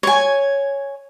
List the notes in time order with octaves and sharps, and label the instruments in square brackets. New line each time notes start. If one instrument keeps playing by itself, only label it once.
[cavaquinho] C#5 G#5